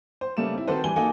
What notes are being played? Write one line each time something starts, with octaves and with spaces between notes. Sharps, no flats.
C5
C#3 G3 A3 A#3 E7
C4 E4
D#3 C4 F#4 A4 B4 C5
E3 G3 G#5 G7
A#3 D#4 F#4 A4 G#5